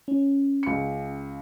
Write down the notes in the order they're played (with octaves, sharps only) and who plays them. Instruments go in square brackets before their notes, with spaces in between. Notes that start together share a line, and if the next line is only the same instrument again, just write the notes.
[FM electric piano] C#4
[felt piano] C#2 C#7